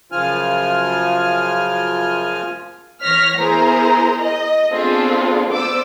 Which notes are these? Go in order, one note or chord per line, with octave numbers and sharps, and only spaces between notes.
F#2 C#3 F3 F4 G#5 F6
E3 C#5 F6 A#6 B6
B3 E4 G#4 A#4 C5 A#5
D#5
B3 C4 D4 F4 G#4 A4
B3 C5 D5 D6 E6